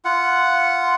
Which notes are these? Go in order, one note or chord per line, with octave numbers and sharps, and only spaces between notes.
F4 F#5